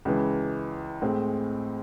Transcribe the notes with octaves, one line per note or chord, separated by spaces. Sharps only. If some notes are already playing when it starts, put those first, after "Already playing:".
C#2 C#3 E3
A2 G#3 C4